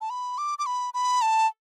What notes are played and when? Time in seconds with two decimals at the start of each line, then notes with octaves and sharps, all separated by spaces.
0.01 A5
0.10 B5
0.38 D6
0.59 D6
0.66 B5
0.94 B5
1.22 A5